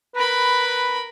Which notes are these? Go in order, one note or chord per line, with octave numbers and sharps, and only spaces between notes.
A#4 B4 B5